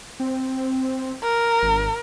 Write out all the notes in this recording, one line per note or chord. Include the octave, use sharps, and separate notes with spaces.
C4
A#4
G#1